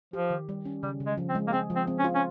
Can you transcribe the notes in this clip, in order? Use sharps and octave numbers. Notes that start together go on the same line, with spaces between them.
F3 G4
D#3
G3
C#4
C#3 G3
C#3
G#3
F3
C4
G#3
A#3
C4 G#4
F3
C4
C4
C#4
F4
C#4